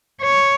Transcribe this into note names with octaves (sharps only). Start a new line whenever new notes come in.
C#5